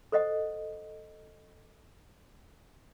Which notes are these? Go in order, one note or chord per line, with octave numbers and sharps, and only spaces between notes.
A4 C5 D#5 F#5